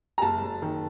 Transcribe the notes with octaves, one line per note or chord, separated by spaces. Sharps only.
A#5
F#1 A5
F#1
D#3